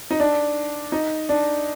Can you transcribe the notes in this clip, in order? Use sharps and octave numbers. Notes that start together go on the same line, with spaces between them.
D#4
D4
D#4
D4